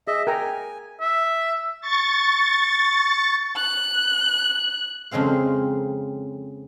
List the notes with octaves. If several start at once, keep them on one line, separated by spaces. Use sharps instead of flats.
G#4 D#5 E5
A#4 G5 G#5 A#5
E5
C#6 A6
F#6
F2 C#3 G#3 C4 F5